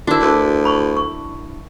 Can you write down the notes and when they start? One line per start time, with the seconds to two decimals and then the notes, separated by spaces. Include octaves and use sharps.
0.07 D4 E4 F#4 A#4
0.21 D2
0.65 B5 C#6
0.97 C#6